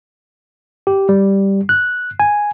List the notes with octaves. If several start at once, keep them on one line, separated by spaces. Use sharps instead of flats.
G4
G3
F#6
G#5